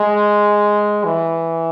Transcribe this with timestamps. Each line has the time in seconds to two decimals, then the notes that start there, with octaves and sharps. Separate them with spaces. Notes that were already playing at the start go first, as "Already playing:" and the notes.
Already playing: G#3
1.05 E3